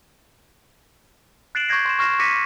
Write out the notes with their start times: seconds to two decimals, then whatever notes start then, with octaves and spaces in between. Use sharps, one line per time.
1.55 F#6 A6 C7 D7 E7 F#7
1.68 C#6 D6 G6 G#6 A#6 C7
1.85 C6 E7
1.99 C#6 F6 A#6 C7 E7
2.19 D6 A#6 B6 C#7 D#7